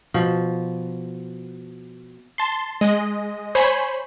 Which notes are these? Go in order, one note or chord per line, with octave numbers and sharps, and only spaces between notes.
B2 F3
A5 C6
G#3 D#5
C5 C#5 G#5 B5